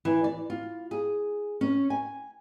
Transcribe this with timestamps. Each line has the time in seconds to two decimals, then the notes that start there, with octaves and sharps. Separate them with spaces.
0.05 E3
0.24 D5
0.50 F4
0.91 G#4
1.61 C#4
1.90 G#5